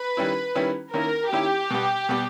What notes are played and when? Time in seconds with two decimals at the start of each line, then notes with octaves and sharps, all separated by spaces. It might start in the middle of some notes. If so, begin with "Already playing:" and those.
Already playing: B4
0.17 D#3 G3 C#4 E4
0.55 D#3 G3 C#4 E4
0.93 D#3 A#3 C#4 E4 A#4
1.31 D#3 A#3 C#4 E4 G4
1.70 B2 G3 B3
2.09 B2 G3 B3